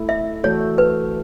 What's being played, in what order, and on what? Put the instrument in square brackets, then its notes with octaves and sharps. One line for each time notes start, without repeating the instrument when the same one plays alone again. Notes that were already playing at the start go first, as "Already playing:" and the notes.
Already playing: [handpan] A3 E4 A4
[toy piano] E5
[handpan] E3 A3 F#4 A4 [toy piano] C#5
[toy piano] B4